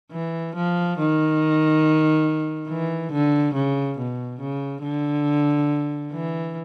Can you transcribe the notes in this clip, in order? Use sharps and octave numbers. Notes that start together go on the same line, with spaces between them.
E3
F3
D#3
E3
D3
C#3
B2
C#3
D3
E3